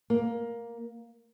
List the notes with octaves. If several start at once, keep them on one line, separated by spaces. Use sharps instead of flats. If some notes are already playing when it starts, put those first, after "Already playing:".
A#3